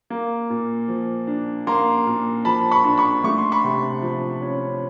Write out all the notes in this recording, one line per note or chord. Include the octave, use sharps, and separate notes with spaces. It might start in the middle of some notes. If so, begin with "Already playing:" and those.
A#3
A#2
F3
D4
A#3 A#5 C6
A#2
F3 A5 B5
B5 C#6
D4
B5 C#6
A3 C#6
C6
B5 C#6
C3
F3
C#4